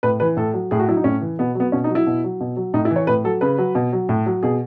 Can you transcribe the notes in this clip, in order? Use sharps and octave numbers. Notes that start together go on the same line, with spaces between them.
A2 B4
E3 B4
A2 A4
F#3
A2 G#4
F#4
F#3 E4
D#4
A2 C#4
E3
B2 B3
F#3 B3
B2 C#4
D#4
F#3
E4
B2
F#3
B2
F#3
A2 D#4
E4
E3
C#5
A2 B4
F#3 A4
C#3 B4
F#3
B2
F#3
A2
F#3
B2 G#4